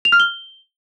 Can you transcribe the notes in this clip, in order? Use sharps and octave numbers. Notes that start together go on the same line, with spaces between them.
F7
F6
G7